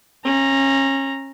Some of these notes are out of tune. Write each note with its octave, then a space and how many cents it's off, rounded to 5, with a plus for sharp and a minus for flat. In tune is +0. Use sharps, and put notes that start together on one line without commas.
C#4 -30 A#5 +0